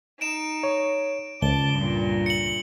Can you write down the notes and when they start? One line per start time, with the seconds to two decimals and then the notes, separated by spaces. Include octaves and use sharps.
0.21 D#4 D7 E7
0.63 C#5
1.42 C#2 A5 D6 G7
1.74 G2 A#2
2.26 C#7 F#7